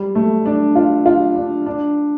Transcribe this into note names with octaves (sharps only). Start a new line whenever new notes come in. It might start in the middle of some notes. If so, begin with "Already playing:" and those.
Already playing: G3
A3
D4
F4
F4
D4
D4